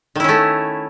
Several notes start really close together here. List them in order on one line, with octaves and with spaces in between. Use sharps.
D#3 E4 C#4 A3